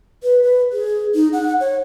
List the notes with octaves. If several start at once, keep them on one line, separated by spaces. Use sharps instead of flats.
B4
B4
G#4
D#4
F#5
C#5